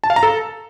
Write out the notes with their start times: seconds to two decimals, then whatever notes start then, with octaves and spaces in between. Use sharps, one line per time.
0.04 A5
0.10 F5
0.16 A#5
0.23 A4